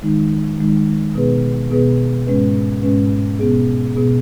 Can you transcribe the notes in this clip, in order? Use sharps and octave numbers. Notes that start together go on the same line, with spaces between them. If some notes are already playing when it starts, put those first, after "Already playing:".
D#3 G#3 D#4
D#3 G#3 D#4
B2 B3 G#4 B4
B2 B3 G#4 B4
G#2 G#3 C#4 B4
G#2 G#3 C#4 B4
B2 B3 G#4
B2 B3 G#4